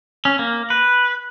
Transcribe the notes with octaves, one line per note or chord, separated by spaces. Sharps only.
C#4
A#3
B4